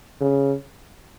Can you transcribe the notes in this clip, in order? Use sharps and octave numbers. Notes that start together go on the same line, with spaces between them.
C#3